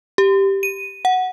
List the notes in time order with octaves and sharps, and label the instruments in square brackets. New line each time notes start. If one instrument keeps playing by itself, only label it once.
[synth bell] G4
D#7
F#5